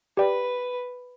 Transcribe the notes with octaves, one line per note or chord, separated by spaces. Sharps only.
G4 B4 D5 G5